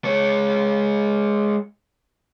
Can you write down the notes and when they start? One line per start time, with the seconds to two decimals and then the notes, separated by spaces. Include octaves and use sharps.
0.05 G#3 C#5